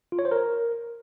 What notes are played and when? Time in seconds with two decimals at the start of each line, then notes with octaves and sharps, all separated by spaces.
0.12 F4
0.19 C#5
0.25 C5
0.31 A#4